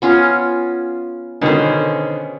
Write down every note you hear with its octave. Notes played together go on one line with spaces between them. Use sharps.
B3 C#4 F4
B2 D3 D#3 C#4 C5